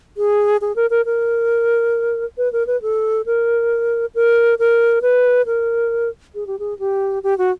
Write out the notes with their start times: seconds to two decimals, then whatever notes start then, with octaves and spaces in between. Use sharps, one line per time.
0.17 G#4
0.61 G#4
0.76 A#4
0.90 A#4
1.06 A#4
2.38 B4
2.53 A#4
2.67 B4
2.82 A4
3.26 A#4
4.15 A#4
4.59 A#4
5.02 B4
5.46 A#4
6.35 G#4
6.47 G4
6.59 G#4
6.79 G4
7.23 G4
7.38 F#4